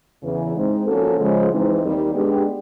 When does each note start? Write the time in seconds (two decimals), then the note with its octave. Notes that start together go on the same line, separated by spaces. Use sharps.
0.22 E2 C#3 E3
0.55 G#3 C4 D#4
0.86 F3 A#3 C#4 F#4 A4
1.18 C#3 F3 G#3
1.50 E3 G#3 C4 D#4
1.81 D#2 D#3 G3
2.13 G#3 B3 D4 G4